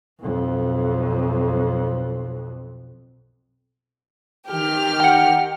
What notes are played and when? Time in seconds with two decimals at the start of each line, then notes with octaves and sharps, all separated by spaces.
0.19 B1 F2
4.51 D#3 G4 F6
5.00 F#5 G5